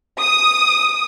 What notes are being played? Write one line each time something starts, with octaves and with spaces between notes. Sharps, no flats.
D#6